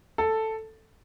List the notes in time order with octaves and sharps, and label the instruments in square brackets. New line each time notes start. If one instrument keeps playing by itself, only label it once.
[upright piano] A4